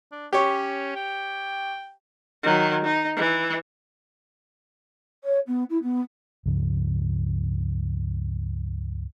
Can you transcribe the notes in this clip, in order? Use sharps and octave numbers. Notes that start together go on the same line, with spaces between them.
D4
C#4 G4 C#5
G5
D#3 F#3
D#4
E3
C#5
B3
E4
B3
C#2 G2 C#3 F3